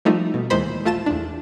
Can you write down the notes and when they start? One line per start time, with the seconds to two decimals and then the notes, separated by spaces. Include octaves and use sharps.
0.05 F3 G3 A3 D#4 F4
0.34 B2
0.50 D#2 A#2 E3 G#3 C5 B5
0.85 A1 A3 F4 A5 A6 E7
1.06 E2 D4